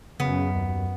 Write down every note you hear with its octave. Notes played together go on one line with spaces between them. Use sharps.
F#2 C#3 B3
D#2